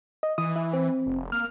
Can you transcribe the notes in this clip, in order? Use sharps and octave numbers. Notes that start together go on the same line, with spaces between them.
D#5
E3 D#6
E4
C4
F1
A#3 F6